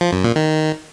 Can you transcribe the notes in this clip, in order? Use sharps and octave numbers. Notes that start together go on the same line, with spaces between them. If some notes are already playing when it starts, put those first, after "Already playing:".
F3
F#2
A#2
D#3